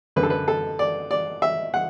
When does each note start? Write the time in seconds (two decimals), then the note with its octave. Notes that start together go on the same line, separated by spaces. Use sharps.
0.16 F#2 D3 B4
0.23 A4
0.30 B4
0.48 A4
0.79 D5
1.11 D5
1.42 E5
1.74 F#5